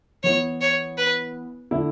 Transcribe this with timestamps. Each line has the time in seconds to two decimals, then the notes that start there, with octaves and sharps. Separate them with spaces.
0.23 E3 B3 E4 C#5
0.61 C#5
0.97 B4
1.71 D3 A3 E4